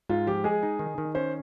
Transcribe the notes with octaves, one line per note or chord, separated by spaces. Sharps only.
G#2 F4
F3 G4
G#3 G#4
D#4
D#3
D#3
C#4 C5